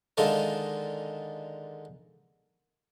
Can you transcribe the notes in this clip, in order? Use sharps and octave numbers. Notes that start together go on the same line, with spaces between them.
D3 D#3 G#3 F4 A4 A#4